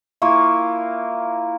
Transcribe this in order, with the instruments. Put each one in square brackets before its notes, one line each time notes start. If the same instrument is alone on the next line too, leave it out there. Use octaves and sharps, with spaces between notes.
[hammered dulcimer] A#3 E4 F4 C#6